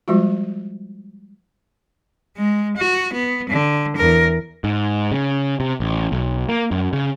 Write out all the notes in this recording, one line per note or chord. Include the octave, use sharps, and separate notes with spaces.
F3 G3 G#3 F4 F#4
G#3
F#4
B3
D3
E2 A#4
G#2
C#3
C3
A1
B1
A#3
F#2
C#3